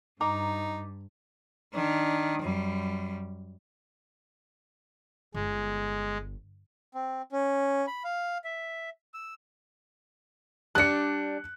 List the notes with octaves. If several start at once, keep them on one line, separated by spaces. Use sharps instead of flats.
G2 D#4 A#5 D6
D#3 D4
F#2 G3
G1 G#3
C4
C#4
B5
F5
E5
E6
G3 D4 F#6 C#7